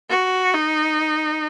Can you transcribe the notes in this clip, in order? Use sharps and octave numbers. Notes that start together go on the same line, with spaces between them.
F#4
D#4